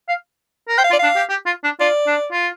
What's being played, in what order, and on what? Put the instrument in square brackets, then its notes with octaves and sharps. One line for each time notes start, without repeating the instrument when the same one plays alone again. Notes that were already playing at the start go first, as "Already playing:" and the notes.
[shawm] F5
A#4
[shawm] C5 [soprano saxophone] G5
[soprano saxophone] F5
[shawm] F4 [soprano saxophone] D5
[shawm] D4 [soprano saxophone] F5
[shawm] G4
G4
F4
D4
[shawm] F4 [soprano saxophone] D5
[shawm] D4
F4